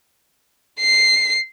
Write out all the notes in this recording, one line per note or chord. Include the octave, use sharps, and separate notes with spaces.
C7